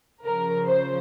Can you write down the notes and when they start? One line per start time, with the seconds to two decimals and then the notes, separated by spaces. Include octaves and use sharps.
0.23 C#3 F3 A#4
0.66 C5